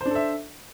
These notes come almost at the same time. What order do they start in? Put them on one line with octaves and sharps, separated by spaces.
C5 D4 A4 E5